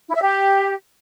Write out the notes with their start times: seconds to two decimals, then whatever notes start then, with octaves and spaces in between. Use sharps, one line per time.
0.08 E4
0.15 E5
0.22 G4